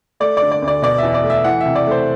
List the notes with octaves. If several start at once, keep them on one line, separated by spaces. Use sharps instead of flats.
A3 D5
D5
D3
D5
D2
D5
B2 D5
E2 E5
D5
A3
E5
E3 F#5
C3 E5
D5
A3 C5